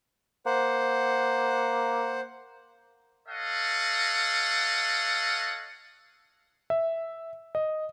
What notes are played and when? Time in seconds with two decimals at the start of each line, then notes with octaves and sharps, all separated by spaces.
0.46 A#3 C5 F#5
3.28 A4 C#5 D#5 F5 F#5
6.70 E5
7.55 D#5